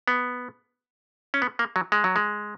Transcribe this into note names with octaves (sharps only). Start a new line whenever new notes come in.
B3
C#4
B3
A#3
F#3
G#3
F#3
G#3